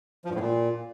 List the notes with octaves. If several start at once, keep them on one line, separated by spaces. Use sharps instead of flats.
F3
G2
A2
A#2